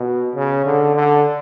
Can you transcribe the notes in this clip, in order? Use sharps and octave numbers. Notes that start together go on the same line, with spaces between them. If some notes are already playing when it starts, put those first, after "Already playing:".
Already playing: B2
C#3
D3
D3